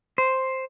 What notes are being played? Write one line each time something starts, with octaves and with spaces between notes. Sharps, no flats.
C5